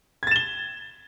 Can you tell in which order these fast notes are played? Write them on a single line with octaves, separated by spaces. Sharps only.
G#6 A6 E7 G7